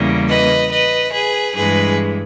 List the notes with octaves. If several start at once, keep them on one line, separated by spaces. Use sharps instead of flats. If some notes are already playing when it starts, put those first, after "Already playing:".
Already playing: E2 C#3 G3 A#3
B4 D#5
B4 D#5
G#4 B4
G2 E3 G#3 G#4 B4